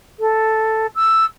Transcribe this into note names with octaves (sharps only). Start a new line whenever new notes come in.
A4
E6